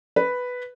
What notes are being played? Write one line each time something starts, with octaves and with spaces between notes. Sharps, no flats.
B4